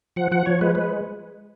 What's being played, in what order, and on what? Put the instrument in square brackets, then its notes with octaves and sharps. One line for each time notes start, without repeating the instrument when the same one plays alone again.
[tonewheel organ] F3 F#5
F3 F#5
F3 C#5
G#3 B4
G#3 B4